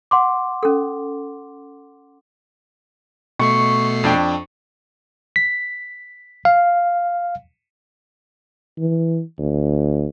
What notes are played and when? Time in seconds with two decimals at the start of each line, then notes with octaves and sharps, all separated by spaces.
0.11 F#5 C6 D6
0.63 C#4 A4
3.39 B2 A3 C#6 C7
4.04 F2 D4 G5
5.36 B6
6.45 F5
8.78 E3
9.39 D2